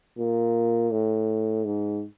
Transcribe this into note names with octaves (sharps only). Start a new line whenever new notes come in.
A#2
A2
G#2